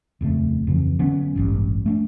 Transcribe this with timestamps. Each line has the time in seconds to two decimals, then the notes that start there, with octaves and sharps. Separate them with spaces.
0.21 D#1 F2 C#3 A3
0.67 F2 C#3 E3
0.99 D3 F#3 B3 C#4
1.36 E1 A1 G2
1.86 A3 A#3 D4